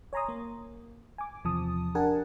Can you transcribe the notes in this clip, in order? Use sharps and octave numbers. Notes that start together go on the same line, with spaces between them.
C#5 G#5 A#5 C6 D#6
A#3
G#5 D6
E2 C3 F3 A5 D#6
D4 G4 A#4 F#5 G#5 A5